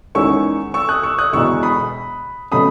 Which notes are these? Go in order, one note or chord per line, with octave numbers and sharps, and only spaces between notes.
E2 D#3 G#3 C#4 C#6 E6
C#6 E6
D#6 F#6
C#6 E6
D#6 F#6
E1 E2 B2 C#6 E6
B5 D#6
B2 F#3 A3 C#4 B5 D#6